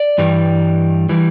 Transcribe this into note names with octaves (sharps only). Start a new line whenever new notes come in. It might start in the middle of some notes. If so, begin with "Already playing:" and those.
Already playing: D5
G2 E3 G3
E3 G3